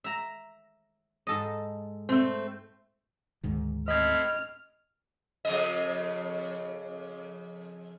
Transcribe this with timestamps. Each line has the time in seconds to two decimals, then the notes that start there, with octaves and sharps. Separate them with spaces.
0.04 E5 A#5
1.27 G#2 A4 D#5
2.09 A3 C4
3.43 D2 G#2 D#3
3.88 A2 C4 D#5 B5 F6 G#6
5.45 F2 C#3 D#5